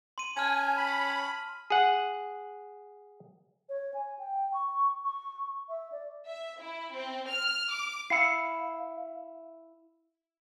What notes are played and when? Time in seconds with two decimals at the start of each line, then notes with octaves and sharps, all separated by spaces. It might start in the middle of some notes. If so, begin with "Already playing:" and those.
0.18 C6 D#7
0.37 C#4 G#5 A5 F6
0.76 B5
1.70 G#4 F#5
3.69 C#5
3.94 G#5
4.19 G5
4.54 C#6
5.04 C#6
5.69 E5
5.92 D5
6.26 E5
6.60 E4
6.93 C4
7.29 F6
7.71 D6
8.10 E4 F5 C7 C#7